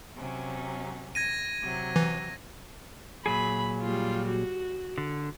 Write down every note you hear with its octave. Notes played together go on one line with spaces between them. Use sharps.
C3 F#3 C#4
G#6 A#6 D#7
C3 F#3
E3
A#2 F#3 G#4 B5
G3 F4
F#4
D3